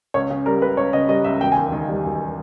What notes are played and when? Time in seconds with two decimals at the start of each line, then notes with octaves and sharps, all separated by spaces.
0.14 C#2 C#5
0.30 C#3
0.46 G3 A#4
0.62 C#2 B4
0.77 C#2 C#5
0.93 C#3 D#5
1.09 G3 D#5
1.24 C#2 E5
1.41 E1 G5
1.52 G#5
1.56 D#2
1.72 D#3
1.89 G3
2.04 E1